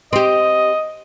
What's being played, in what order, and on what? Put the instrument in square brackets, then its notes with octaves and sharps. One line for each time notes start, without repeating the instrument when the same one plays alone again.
[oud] C4 G4 [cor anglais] D#5